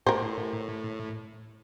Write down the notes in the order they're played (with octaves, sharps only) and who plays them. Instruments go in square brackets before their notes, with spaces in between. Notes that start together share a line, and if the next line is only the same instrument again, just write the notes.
[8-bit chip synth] A2 [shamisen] A#4 C5